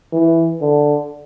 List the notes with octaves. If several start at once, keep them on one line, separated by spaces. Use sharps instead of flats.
E3
D3